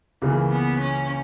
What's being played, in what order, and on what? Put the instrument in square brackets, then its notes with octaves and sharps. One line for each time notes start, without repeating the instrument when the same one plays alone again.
[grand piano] C#2 C#3 E3 A#3 [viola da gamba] G#3
[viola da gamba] B3
C#4